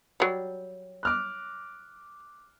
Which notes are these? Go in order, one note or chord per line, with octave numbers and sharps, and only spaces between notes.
F#3 G3
D6 F6 F#6